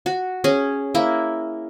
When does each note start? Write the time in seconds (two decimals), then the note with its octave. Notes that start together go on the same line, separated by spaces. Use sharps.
0.06 F#4
0.44 C#4 G#4
0.95 A#3 E4